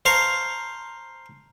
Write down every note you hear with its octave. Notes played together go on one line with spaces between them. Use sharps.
C5 F5 A5 A#5 C#6